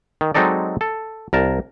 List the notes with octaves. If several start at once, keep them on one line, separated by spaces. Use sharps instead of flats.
D#3
F#3 G#3 C4 D#4 A4 D5
A4
C2 A#4 A5